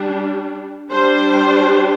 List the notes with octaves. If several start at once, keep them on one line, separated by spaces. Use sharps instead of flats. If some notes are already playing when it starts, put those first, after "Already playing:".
Already playing: G3 D4
G3 D4 C5